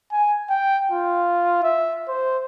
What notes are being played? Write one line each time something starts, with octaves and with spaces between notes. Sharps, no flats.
G#5
G5
F4
E5
C5